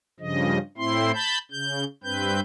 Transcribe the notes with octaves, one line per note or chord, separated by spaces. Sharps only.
G2 C#3 F3 D#5
A2 C4 E4 C6
A5 B5 G6
C#3 G6
G2 C4 B4 G6